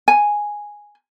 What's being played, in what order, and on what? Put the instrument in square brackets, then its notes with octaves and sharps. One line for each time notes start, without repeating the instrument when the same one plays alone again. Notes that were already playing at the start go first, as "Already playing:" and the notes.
[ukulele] G#5